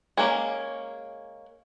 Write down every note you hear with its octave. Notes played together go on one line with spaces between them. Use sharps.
G#3 A#3 C#4 G#4